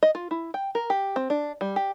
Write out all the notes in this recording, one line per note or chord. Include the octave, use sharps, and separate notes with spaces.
D#5
F4
E4
G5
A#4
G4
C4
D4
G3
G4